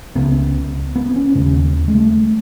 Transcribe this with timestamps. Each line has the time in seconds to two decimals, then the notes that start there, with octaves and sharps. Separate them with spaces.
0.15 C#2 C#3 B3
0.95 B3
1.16 C#4
1.35 D#2 C#3
1.88 G#3
1.95 A3